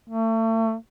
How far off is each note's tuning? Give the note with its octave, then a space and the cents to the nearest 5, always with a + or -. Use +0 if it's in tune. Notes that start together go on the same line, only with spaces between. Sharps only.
A3 +35